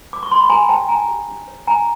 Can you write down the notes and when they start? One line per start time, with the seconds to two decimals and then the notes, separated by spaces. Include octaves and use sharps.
0.13 D6
0.23 C#6
0.31 C6
0.40 B5
0.49 G4 G#5 A#5
0.61 G#5
0.69 C#5 G5 A5
0.89 D4 G#5 A#5
1.08 G4
1.28 D4
1.48 C#5
1.67 D4 G#5 A#5